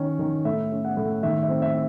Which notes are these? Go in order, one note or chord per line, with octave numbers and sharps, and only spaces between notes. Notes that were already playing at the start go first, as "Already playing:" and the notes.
Already playing: D#3 C#4
D#3
A2 E5
C#4
F#5
A2
D#3 E5
E5
C4
E5